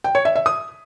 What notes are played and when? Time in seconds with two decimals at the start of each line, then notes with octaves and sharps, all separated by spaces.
0.04 G5
0.15 C#5
0.25 E5
0.35 E5
0.46 D#6